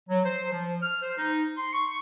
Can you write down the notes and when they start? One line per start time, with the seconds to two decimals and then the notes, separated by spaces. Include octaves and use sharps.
0.09 F#3
0.25 C5
0.52 F3
0.82 F6
1.02 C5
1.18 D#4
1.57 C6
1.73 C#6